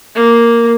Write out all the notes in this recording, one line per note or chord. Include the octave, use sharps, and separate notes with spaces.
A#3